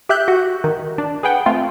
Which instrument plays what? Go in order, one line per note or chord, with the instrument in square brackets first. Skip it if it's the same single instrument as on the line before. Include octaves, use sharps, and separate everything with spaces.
[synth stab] G4 E5 F#6 G6
F#4
D#3
D4
G#4 B4 F#5 G5
A3 C4 F4